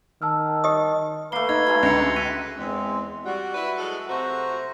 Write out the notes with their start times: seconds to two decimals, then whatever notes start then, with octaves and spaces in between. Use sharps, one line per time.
0.22 D#3 A5 E6 F6
0.64 G4 D#5 D#6
1.32 A3 A#3 B4 C7 G7
1.49 D#4 G#6
1.66 F#3 G#3 A3
1.83 C#2 D3 A#6 C#7
2.16 F#6 B6 D#7
2.58 E2 G#3 C4
3.26 G3 F#4 F#5
3.54 E4 B4
3.78 F#3 G#3 A4
4.09 C3 A3 F#4 C5 A#5